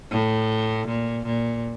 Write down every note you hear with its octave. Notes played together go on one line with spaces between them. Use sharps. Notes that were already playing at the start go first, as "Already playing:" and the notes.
A2
A#2
A#2